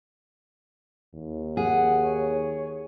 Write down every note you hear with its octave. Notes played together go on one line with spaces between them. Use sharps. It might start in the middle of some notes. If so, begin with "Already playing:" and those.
D#2
G#4 F#5
C#5